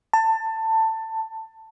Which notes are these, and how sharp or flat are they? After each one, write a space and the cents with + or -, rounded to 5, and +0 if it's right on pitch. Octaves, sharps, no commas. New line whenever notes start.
A5 +15